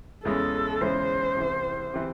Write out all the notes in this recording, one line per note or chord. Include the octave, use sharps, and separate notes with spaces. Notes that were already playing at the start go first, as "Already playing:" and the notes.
E2 C#3 E3 G#3 C#4 A4
E2 C#3 E3 G#3 C#4 C5
C2 C3 E3
C3 E3